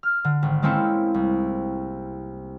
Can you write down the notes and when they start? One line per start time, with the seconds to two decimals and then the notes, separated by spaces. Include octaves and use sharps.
0.03 F6
0.24 D3
0.42 G#1
0.62 G#3 A#3 C4 C#4 E4 A4
1.14 C2